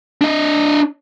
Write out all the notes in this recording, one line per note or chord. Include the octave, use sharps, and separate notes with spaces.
D4 D#5